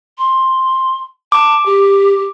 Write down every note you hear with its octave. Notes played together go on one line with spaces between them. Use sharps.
C6
A5 D6
G4